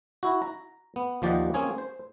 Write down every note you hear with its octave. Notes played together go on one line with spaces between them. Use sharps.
E4 F#4
A#5
B3
D#2 F3 G4 D5 D#5 F#5
A#3 C4 C#4 G#4 C#5
C5